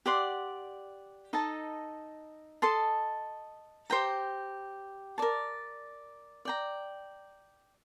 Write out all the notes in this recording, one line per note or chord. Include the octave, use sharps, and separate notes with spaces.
G4 D5 F#5 C6
D#4 A4 D#5 A5
A4 D#5 A5 C6
G4 C5 G5 A#5
A#4 D5 A5
D5 G5 A#5